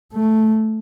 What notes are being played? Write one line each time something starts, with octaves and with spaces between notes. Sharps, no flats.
A3